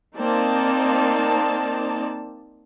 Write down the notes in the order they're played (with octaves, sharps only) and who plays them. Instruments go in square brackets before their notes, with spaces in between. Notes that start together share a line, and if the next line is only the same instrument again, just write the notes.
[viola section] A#3 C4 D#4 D5 A5